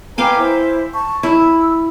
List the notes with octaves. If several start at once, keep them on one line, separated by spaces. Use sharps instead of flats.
B4 F5 G5 G#5 A#5 D6
E4 C5
A5 C#6
E4 E6